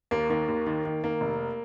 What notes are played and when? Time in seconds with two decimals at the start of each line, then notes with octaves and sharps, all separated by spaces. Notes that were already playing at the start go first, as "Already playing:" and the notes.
0.11 D#2 A#3
0.29 D#3 A#3
0.48 D#2
0.66 D#3
0.85 D#3
1.04 D#3 A#3
1.21 F1